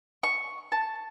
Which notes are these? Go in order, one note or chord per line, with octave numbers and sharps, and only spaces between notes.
C#6
A5